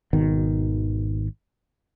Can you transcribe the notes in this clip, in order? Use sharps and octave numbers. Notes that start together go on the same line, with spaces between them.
G#1 B2 D#3